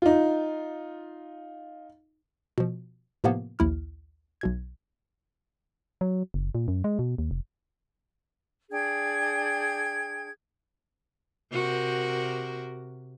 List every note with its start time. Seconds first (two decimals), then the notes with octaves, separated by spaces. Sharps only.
0.02 D#4 F4
2.58 B2 F3
3.24 A2 C3 F3 A#3 B3
3.59 A#1 D#2 E4 F6
4.41 B1 B2 G#6
6.01 F#3
6.34 F#1
6.55 A#2
6.68 F#2
6.84 G#3
6.99 B2
7.18 D#2
7.31 F1
8.70 D4 G#4 G5 G#6
11.51 C3 F#4 A#4